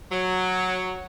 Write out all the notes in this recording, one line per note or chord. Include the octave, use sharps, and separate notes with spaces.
F#3